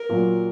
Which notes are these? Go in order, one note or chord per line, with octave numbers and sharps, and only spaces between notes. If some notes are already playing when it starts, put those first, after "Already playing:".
Already playing: A#4
A#2 F#3 A#3 F4